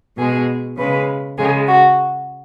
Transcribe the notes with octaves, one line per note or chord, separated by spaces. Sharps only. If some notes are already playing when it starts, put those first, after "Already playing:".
B2 G#3 G#4
C#3 G#3 B4
C#3 G#3 G#4
F#4